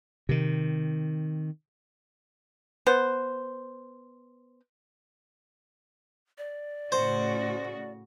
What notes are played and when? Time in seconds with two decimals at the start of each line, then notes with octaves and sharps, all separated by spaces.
0.29 C3 D#3
2.87 B3 C5
6.38 D5
6.92 A2 C#3 F#4 C5